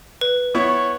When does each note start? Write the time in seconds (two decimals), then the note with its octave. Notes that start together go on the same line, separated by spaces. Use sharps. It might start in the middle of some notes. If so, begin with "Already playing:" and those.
0.21 B4
0.55 B3 E4 C#5